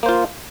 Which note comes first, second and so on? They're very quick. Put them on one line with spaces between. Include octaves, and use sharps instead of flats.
A#3 C5 F4